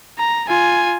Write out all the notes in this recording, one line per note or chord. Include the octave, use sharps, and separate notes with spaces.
A#5
F4 G#5